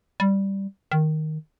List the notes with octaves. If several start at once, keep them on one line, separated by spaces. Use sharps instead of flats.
G3
D#3